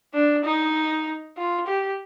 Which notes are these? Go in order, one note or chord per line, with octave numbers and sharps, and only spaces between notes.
D4
D#4
F4
G4